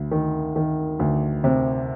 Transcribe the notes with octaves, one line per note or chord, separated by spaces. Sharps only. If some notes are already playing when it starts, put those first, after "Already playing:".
Already playing: D2
D#3
D#3
D2
C3